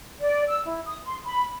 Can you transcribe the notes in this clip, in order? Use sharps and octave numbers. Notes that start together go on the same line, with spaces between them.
D5
E6
E4
D#6
C6
B5